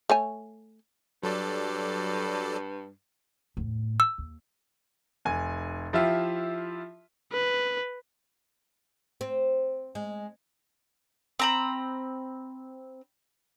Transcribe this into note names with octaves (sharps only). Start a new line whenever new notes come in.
A3 C#5 G#5
G2 F#3 A4 D5
E2 A2
E6
D#2
F1 G#5
F3 E4 F4 G4 E5
B4
C4
G#3
C4 A#5 B5